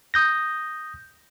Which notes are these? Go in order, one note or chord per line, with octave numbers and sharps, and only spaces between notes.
D#6 G6 A#6